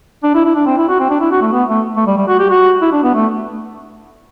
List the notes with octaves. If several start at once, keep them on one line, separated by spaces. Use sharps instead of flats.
D4
E4
E4
D4
C4
E4
F#4
C4
D4
E4
F#4
A3
B3
A3
A3
G3
G3
F#4
G4
F#4
E4
D4
B3
A3